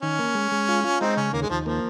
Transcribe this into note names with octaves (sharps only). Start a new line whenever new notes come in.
D#3 C#4
A#3
G#3
G#3
F4
F4
G#3 C4 D#4
C#3 C#4
D#2 A#3
G#3
D#2 F3
F3 A#3